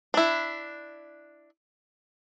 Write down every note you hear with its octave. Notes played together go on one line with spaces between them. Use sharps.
D4 E4